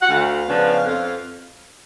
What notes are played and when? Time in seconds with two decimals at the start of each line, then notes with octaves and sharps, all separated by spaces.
0.01 F#5
0.09 D2 F5
0.47 C#3 F3 B3 D4
0.85 F2